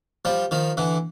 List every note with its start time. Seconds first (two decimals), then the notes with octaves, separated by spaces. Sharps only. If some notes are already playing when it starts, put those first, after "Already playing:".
0.25 F3 G3
0.51 D#3 F3
0.77 D3 E3